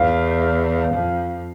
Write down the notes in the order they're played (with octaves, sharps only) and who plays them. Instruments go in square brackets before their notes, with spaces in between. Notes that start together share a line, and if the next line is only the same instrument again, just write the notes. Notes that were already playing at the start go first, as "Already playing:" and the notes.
Already playing: [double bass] E2 [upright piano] F5
[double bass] F2